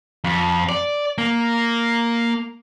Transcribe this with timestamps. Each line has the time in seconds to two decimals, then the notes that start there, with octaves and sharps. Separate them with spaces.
0.24 F2
0.69 D5
1.18 A#3